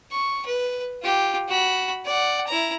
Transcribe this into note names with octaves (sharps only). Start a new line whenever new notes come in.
C#6
B4
F4 G4
F#4 B5
D5 F#5
E4 A#5